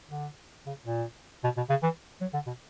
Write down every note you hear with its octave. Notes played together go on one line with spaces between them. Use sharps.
D3
C#3
A#2
B2
B2
C#3
E3
F#3
D3
B2